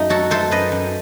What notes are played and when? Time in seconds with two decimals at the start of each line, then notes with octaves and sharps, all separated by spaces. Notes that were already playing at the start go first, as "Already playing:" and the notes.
Already playing: F#2 A3 D#4
0.09 F#3 F#4 A4
0.30 A3 A4 C5
0.51 F#2 B4 D#5
0.72 F#2